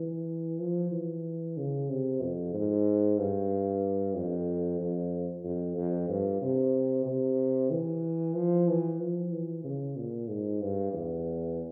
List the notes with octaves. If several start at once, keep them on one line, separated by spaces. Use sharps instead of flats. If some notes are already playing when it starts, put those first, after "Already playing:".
Already playing: E3
F3
E3
C#3
C3
F2
G#2
G2
F2
F2
F2
F2
G2
C3
C3
E3
F3
E3
F3
E3
C#3
A#2
G#2
G2
E2